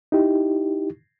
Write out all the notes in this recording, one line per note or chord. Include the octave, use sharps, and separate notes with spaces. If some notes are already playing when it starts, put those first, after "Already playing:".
D#4 E4 G4